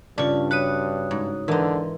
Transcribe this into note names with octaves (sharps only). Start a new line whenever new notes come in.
G2 C#3 C#4 D4 F4 A4 D5
F#4 C#5 B5 D#6 F#6 D#7
G#2
D3 E3 D#4 A#4 C6